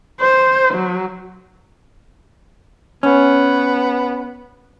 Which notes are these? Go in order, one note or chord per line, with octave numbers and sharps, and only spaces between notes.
C5
F#3
B3 C#4